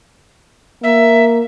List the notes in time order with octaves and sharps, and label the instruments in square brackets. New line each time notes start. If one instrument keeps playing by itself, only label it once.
[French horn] A#3 [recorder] E5